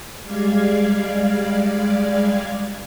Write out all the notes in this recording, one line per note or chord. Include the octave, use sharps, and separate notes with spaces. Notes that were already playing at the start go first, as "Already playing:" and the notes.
G3 G#3 D5 F5 G#6